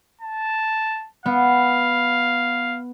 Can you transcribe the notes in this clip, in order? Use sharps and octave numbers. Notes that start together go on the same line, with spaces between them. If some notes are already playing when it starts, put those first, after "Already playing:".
A5
B3 F5